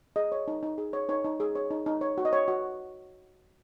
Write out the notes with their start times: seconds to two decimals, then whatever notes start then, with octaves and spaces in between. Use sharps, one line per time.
0.16 G#4 D#5
0.32 C#5
0.48 D#4
0.63 D#4
0.78 G#4
0.93 C#5
1.09 D#4 C#5
1.24 D#4
1.40 G#4
1.55 C#5
1.70 D#4
1.86 D#4
2.01 C#5
2.18 F#4
2.25 D#5
2.33 C#5
2.48 F#4